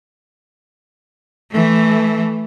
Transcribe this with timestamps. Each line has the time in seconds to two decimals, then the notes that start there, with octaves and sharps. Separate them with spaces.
1.51 E3 A3